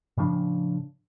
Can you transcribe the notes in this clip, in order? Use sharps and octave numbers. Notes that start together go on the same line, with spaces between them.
A2 C#3 F3 D4